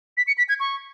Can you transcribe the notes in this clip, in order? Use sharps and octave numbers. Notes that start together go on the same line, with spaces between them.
B6
C#7
B6
G#6
C#6